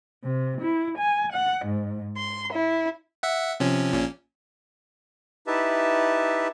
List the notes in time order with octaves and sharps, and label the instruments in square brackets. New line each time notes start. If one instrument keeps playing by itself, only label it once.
[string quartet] C3
E4
G#5
F#5
G#2
C6
E4
[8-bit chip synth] E5 F#5
C3 F3 C#4
A#1 A#2 C#4
[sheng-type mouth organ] D#4 E4 G4 B4 E5 A5